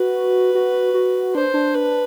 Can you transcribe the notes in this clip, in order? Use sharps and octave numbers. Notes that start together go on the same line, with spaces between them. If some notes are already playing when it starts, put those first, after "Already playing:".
Already playing: F#4 B4
F#4
F#4
D4 C5
D4
B4